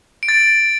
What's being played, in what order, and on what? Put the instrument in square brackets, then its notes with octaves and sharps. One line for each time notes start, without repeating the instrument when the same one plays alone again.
[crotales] D7
A6
D7